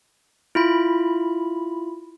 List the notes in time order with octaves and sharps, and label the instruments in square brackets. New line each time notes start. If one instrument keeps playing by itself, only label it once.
[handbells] E4 F4 B5